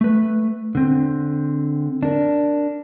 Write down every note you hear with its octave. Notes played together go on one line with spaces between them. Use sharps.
A3 B4
D3 C4
D4 A#4